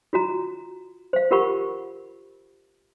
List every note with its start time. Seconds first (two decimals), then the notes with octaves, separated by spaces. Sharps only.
0.13 F4 F#4 A#5
1.13 C5 F5
1.31 F4 G4 A#4 F#5 B5 C#6